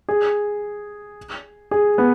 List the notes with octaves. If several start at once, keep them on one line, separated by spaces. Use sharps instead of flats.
G#4
G#4
B3